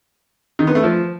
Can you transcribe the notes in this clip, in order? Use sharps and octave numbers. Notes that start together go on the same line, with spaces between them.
D#3
B3
A3
F3